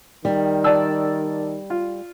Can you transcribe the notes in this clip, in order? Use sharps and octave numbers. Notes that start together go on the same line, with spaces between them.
D#3 G3
D5 A5 E6
F4